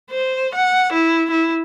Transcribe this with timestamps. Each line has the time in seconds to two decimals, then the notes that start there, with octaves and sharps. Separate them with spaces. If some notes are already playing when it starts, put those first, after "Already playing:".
0.11 C5
0.55 F#5
0.93 E4
1.31 E4